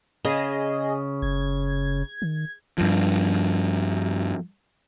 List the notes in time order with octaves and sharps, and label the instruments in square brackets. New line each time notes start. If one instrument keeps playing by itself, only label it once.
[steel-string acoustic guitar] C#3 [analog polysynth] G#4 D#5
[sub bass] F#1 [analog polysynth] G#6
[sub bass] D#3
[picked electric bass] G2 F3